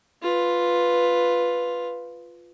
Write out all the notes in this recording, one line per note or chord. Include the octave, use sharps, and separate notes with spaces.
F4 B4